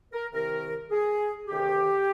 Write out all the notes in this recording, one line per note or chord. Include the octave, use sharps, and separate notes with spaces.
A#4
C2 C3 D#3 A#4
G#4
D2 C3 D#3 G4